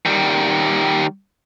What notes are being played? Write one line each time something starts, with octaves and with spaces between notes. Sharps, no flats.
D#3 G3